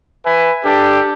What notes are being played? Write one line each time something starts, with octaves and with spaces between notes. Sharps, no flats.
B4 E5 G#5
D4 G4 A4